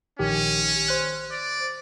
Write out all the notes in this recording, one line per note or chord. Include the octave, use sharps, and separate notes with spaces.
A#1 D#3 C#4 G4
C5 F#6
D5